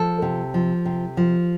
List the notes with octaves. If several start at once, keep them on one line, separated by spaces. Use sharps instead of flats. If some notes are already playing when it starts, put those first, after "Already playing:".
Already playing: F3 A4
C3
F3
C3
F3